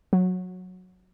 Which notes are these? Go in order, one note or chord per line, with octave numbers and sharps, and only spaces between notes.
F#3